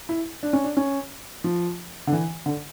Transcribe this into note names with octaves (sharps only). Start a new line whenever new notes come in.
E4
D4
C#4
D4
C#4
F3
D3
E3
D3